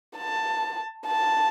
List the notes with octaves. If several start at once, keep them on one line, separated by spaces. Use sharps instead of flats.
A5
A5